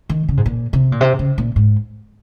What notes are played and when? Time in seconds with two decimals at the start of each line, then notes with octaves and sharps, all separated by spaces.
0.09 D#3
0.28 C#3
0.37 G#2
0.46 A#2
0.73 C3
0.92 A#2
1.01 C3
1.19 C#3
1.38 A#2
1.56 G#2